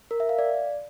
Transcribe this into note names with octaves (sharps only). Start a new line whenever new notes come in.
A#4
E5
F5
D5